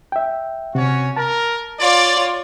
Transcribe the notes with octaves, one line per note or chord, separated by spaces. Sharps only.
E5 G5
C3 C#4 F#4 C#5
A#4 A5
F4 C#5 D5